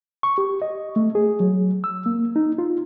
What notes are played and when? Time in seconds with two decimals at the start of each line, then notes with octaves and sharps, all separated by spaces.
0.23 C#6
0.38 G4
0.62 D#5
0.96 A3
1.15 G#4
1.40 F#3
1.84 E6
2.06 A#3
2.36 D#4
2.58 F4